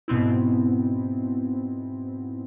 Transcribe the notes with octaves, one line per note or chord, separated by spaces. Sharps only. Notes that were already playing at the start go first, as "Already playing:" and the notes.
G#2 B2 B3 C4 E4